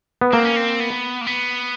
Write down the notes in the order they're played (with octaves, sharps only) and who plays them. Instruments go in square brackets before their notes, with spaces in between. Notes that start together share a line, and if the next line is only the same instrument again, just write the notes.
[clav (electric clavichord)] B3
[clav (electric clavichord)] A#3 [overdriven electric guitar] C4
[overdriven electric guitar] C#4
C4
B3
A#3
B3